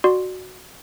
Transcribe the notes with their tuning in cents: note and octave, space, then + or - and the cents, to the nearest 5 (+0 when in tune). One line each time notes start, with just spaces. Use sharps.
F#4 +0 D5 +25 C6 +0